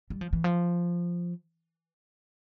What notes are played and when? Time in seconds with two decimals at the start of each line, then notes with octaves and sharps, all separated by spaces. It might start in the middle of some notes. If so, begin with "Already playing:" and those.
0.10 G3
0.21 F3
0.33 E3
0.44 F3